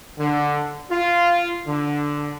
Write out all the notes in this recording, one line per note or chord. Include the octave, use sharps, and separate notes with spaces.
D3
F4
D3